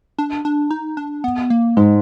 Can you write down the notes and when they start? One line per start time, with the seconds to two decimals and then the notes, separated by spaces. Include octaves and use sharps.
0.18 D4
0.45 D4
0.71 D#4
0.97 D4
1.24 B3
1.50 A#3
1.77 G#2 G#3